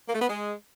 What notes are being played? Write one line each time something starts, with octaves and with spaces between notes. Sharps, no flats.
A#3
A3
B3
G#3